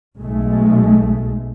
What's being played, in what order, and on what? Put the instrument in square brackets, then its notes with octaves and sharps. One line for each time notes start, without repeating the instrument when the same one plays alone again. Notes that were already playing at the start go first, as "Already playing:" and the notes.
[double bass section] B1 B2 G#3 A3